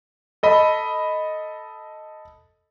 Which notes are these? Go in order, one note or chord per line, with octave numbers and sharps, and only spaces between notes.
A4 D#5 B5